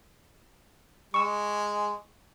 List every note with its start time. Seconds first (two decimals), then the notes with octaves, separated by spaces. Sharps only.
1.14 G#3 C#6 E6